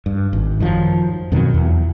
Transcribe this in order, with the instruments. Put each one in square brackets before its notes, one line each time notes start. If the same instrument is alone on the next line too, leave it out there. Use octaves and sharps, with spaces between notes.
[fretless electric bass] G2
G#1
F#2 D#3 F3 F#3
F2 B2 D#3 F#3
E2